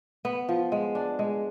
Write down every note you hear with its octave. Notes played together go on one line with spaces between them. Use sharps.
B3
F3
G#3
D4
G#3